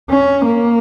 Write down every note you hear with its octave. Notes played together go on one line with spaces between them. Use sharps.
C#4
A#3